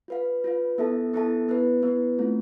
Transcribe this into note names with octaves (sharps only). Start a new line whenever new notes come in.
F4 B4 F5
F4 B4 F5
B3 E4 A4 E5 A5
B3 E4 A4 E5 A5
B3 E4 B4
B3 E4 B4
A3 C4 F4